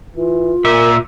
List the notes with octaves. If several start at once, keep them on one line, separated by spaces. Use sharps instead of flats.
E3 F4
A#2 A#4 E5